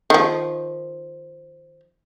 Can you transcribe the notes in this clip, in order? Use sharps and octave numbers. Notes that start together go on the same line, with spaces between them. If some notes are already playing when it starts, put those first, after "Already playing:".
D#3 F3